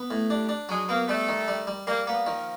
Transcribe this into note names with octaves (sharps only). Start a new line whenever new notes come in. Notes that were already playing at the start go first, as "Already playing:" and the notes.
Already playing: B3
A2
G3 D4
D4
F#3 G#3
A#3 B3
G3 A3
D#3
G3
G3
G3 A#3
A#3 B3
D#3 F3